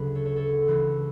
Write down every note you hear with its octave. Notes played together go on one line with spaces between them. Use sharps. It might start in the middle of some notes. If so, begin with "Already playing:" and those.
Already playing: D2 C#3 F#3 F#4 B4
A4 C#5
A4 C#5
A4 C#5
C#2 C#3 E3